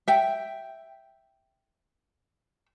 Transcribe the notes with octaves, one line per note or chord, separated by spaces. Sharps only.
E5 G5